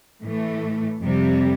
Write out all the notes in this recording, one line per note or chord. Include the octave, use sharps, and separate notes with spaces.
A2 E3 A3
F2 C3 G3